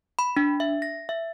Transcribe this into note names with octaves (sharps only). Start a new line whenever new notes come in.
B5
D4
E5
A#6
E5